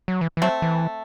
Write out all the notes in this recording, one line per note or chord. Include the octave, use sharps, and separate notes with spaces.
F#3
E3
E3
F#3 A3 C4
E3